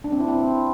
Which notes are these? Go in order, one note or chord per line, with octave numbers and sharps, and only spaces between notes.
D4
C4
E4
C4